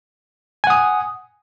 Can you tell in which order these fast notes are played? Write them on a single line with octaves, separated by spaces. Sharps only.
G#5 F#5 D#6